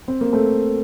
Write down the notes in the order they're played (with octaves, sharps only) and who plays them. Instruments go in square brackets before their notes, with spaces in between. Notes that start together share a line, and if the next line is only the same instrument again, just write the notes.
[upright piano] C4
A#3
A3 C4